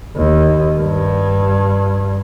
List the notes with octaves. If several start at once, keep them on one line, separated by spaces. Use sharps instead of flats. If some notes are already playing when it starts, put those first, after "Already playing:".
D#2
G2